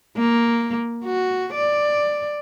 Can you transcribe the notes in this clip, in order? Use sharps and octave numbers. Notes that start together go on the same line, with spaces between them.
A#3
F#4
D5